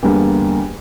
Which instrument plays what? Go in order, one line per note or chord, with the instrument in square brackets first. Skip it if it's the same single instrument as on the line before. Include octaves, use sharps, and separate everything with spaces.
[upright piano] E2 D3 G3 A#3 G4